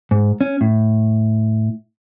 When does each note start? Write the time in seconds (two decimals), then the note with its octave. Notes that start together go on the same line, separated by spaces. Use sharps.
0.11 G#2
0.41 C#4
0.61 A2